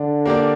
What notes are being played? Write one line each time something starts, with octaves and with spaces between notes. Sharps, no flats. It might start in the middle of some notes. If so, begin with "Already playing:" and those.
Already playing: D3 D4
A#3 D4 G4 A#4 D5